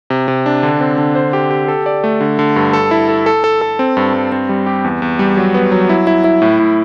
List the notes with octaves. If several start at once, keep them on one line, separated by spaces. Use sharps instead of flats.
C3
C3
D4
D3
C4
D3
C5
G4
G4
A4
D5
A3
D3
D3
G2
A4
E4
A4
A4
A4
A4
C4
G2
G2
C4
G3
G4
E2
E2
G3
F#3
B3
F#3
E4
E4
E4
A2
A2